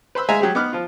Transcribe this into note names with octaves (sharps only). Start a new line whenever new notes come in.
B4 C5 B5 E6
G#3 E5 F5 G#5 A#5
F#3 G4 G#4
B3 D#4 D6 F6 F#6
F3 F4